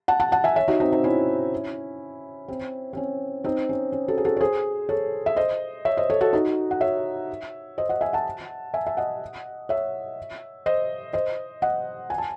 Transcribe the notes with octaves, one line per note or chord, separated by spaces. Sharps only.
F#5 A5
F#5 A5
F#5 A5
E5 G#5
C#5 E5
D#4 F#4
C4 D#4
C4 D#4
C#4 E4
C4
C4
C#4
C4 D#4
C#4
C#4
F#4 A4
G#4
F#4 A4
C#5
G#4 C5
A4 C#5
E5
C5 D#5
C#5 E5
C5 D#5
A4 C#5
F#4 A4
D#4 F#4
F#5
C#5 E5
C5 D#5
D#5 F#5
E5 G#5
F#5 A5
E5 G#5
E5
D#5 F#5
C#5 E5
C5 D#5
C5 D#5
D#5 F#5
G#5
A5